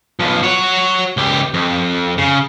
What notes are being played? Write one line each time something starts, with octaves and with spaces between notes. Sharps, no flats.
B1 F3
F#4 C#5
C#2 G4
F2
C#3